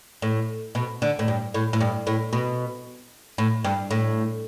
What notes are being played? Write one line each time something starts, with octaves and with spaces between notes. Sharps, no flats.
A2
B2
D3
A2
G2
A2
A2
G2
A2
B2
A2
G2
A2